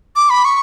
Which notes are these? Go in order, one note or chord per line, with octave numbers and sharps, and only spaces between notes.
D6
B5
C#6